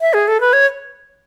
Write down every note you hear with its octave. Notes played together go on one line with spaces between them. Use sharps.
E5
G#4
A4
B4
C#5